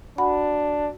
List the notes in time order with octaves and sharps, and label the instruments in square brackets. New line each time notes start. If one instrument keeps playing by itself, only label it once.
[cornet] D4 [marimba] F#4 F#5 B5